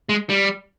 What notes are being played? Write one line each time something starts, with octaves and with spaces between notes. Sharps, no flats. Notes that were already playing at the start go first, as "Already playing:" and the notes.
G#3
G3